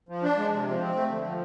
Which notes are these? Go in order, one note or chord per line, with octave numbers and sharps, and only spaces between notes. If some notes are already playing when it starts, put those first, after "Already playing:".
F3
D4
G#3
C3
F3
C4
A3
D3
F3